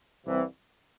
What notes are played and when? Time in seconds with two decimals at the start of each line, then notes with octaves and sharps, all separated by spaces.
0.27 C2 C3 E3